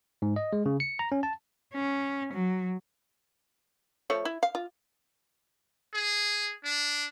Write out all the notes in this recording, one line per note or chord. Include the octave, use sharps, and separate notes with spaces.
G#2
D#5
G#3
C#3
C#7
A#5
C#4
A5
C#4
F#3
F3 A3 C#5
E4
F5
F4
G#4
D4